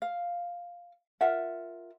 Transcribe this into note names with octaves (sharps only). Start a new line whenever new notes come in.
F5
F4 A#4 E5 F#5